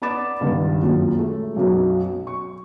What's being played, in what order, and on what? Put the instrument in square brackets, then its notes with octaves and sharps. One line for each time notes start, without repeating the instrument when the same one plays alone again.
[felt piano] B3 D5 B5 D6 A6 E7
C#2 G2 D#3 B3
F#2 A#2
G#3 A3
B1 F#2 B2
C#6